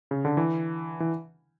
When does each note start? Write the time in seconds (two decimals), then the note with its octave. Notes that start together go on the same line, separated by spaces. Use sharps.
0.11 C#3
0.25 D3
0.37 E3
1.00 E3